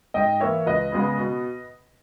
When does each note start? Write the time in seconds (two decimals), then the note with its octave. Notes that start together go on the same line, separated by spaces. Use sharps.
0.14 G#2 D#5 G5
0.40 E3 A#3 C#5 E5
0.66 C#2 B4 D#5
0.92 C#3 G#3 B3
1.18 B2